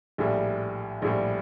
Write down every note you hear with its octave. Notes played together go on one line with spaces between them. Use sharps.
A#1 A2 G3
A#1 A2 G3